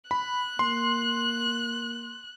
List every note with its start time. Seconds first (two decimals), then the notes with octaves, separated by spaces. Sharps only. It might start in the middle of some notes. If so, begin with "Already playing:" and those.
0.11 B5 F#6
0.59 A#3 C6